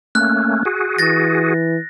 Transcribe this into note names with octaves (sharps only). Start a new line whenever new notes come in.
A3 A#3 C#4 F#6
F#4 G#4
E3 A6 A#6